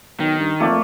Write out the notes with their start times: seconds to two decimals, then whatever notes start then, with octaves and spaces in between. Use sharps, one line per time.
0.20 B1 D#3
0.39 G2
0.60 F2 A3 A#3 D5